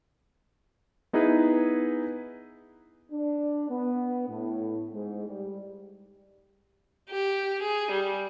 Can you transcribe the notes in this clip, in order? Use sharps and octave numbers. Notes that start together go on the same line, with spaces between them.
B3 D#4 E4 G#4 B4
D4
B3
A2
G#2
G3
G4
G#4
G3